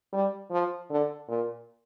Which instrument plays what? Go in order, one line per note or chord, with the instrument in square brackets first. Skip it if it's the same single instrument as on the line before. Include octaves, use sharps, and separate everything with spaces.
[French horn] G3
F3
D3
A#2